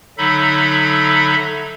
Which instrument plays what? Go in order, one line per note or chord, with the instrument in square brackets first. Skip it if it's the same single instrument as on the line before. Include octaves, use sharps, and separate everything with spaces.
[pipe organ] D3 F#3 D#4 A4 E5 B5